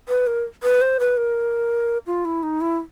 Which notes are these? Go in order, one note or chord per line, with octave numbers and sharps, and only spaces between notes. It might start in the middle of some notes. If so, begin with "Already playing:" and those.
B4
A#4
B4
C5
B4
A#4
F4
E4
D#4
E4